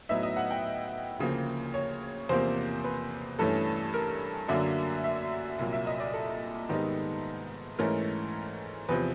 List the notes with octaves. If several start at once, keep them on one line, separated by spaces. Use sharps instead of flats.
A2 F#3 B3 D#4 E5
D#5
F#5
G5
D2 C#3 F3 A#3
C#5
E2 C3 F3 A#3 C5
B4
G2 E3 A3 C#4 A4
A#4
F#2 D3 F#3 A#3 D4 E5
E5
C2 A#2 F#3 A#3
E5
D#5
D5
A4
G#2 D#3 G3 B3 D#4
G#2 E3 A3 C#4 A#4
E2 C3 F3 B4